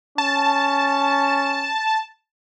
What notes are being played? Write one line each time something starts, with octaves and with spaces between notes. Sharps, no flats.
C#4 A5